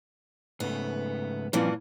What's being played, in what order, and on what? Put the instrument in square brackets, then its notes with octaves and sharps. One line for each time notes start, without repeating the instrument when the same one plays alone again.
[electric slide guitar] G#2 C#3 A3 [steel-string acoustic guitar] B3
[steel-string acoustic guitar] G2 A#2 E3 [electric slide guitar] F3 C4 C#4